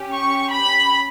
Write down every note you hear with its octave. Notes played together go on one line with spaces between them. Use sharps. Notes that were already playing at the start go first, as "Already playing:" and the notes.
Already playing: C#4 G4
C#6
B5